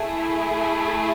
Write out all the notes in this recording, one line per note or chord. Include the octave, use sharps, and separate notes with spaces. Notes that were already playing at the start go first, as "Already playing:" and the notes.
Already playing: A3 E4 G#4